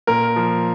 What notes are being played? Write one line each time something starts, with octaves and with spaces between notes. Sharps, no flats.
A#2 A#4
F3